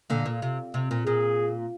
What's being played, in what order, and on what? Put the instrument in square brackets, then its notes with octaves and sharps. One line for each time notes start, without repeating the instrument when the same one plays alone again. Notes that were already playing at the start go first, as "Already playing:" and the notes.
[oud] A#2 D3
A#2
C3
C3
A#2
[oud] A#2 [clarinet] G#4